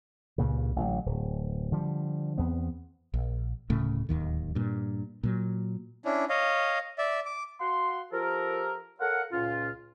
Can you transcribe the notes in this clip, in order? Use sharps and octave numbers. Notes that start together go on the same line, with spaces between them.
C#2 G2 A#2 C#3
A1 D3 F#3
D1
D3 F3 G3
E2 B3 C4
A#1
D1 A2 C#3 A3
D1 G#1 D#2 D#3
G2 A#2
A#2 F#3
C#4 D4 E4
C#5 D#5 F5
D5 E5
D6
F#4 F5 F#5 C6
F3 F4 G4 A4 A#4
A4 A#4 C#5 F5 F#5
C#2 A#2 C#4 F4